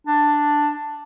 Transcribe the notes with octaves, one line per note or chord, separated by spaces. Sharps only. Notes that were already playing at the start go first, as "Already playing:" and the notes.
D4